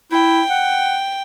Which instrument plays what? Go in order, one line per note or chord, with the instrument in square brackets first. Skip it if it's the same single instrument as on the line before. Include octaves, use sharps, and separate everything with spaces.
[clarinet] E4 [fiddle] G5
[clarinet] F#5